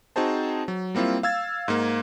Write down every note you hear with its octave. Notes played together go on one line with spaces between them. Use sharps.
C4 D#4 F#4 G#4 C5 A5
F#3
G3 A#3 C4 E4 F4
F5 E6 G#6 A6
G#2 A#3